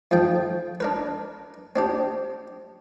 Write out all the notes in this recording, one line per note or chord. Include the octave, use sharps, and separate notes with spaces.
F2 G#2 F3 G5
D4 A#4 B4
C4 D4 G4